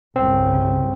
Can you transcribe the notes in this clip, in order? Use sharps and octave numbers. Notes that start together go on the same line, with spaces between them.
G1 C2 C#3 C4